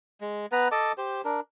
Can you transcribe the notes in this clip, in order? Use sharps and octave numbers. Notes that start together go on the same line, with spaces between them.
G#3
B3 B4 A#5
A4 D#5 A5 D6
G4 C5
D4 A#4